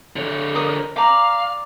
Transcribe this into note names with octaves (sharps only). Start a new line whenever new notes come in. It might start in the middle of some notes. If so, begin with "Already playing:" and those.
D3 C#5
A#4 D#6
D5 F5 A#5